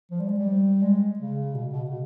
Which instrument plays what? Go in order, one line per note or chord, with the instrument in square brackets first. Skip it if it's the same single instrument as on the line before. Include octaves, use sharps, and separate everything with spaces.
[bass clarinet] F3
G3
G#3
G3
G#3
C#3
B2
B2
C#3